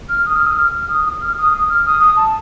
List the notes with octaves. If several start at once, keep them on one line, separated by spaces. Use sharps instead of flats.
F6
D#6
F6
D#6
F6
D#6
D#6
F6
D#6
D#6
F6
D#6
D#6
A5